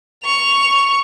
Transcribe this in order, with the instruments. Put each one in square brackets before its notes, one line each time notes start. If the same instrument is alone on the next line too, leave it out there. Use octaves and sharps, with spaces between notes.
[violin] C#6 F7